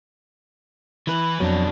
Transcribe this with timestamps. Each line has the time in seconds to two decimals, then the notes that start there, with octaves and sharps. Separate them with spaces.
1.07 E3 B4
1.40 F2 B2 F#3 D4